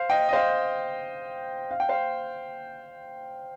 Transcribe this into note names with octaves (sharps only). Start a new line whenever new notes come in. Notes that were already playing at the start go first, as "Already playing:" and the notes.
Already playing: C5 F5
D#5 G5
D#5
C5 F5
F5
G5
C5 F5